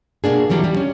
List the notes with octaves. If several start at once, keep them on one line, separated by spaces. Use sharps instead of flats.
B2 A#3 D4 G#4
E3 F#3 G3 D4
G3
C#4